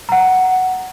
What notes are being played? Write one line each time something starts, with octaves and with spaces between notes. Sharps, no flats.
F#5 A#5